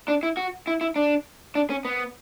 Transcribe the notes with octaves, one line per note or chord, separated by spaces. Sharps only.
D4
E4
F#4
E4
E4
D4
D4
C#4
B3